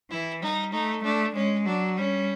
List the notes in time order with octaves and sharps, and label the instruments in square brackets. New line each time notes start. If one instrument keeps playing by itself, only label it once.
[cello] E3 [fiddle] E4
[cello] G3 [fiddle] D#4
[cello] A3 [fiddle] D#4
[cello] A3 [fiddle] D4
[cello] G#3 [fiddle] C#4
[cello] F#3 [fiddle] D4
[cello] G3 [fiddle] C#4